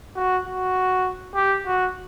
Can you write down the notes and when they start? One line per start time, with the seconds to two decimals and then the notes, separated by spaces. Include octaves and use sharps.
0.16 F#4
0.47 F#4
1.35 G4
1.66 F#4